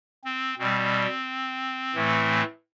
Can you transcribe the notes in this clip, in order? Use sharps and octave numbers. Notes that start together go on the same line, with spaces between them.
C4
B2 G3 C4
A2 E3 A3